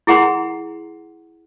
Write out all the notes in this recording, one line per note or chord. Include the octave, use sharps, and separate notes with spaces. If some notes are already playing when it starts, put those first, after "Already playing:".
E4 G#4 F#5 A#5 C6